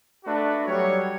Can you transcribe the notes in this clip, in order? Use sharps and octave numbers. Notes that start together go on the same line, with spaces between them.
A3 D4 F#4 B4
F#3 G3 C#5